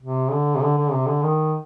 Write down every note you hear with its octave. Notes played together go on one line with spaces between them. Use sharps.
C3
D3
C3
D3
D3
C3
D3
D#3